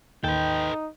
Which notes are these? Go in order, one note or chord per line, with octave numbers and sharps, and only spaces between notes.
D#2 D#4 A4 B4 G5